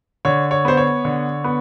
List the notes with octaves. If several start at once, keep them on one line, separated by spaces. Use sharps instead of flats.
D3 C#5
C#5
B3 C5
C#5
D3
B3